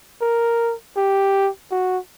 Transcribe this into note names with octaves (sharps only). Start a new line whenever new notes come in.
A#4
G4
F#4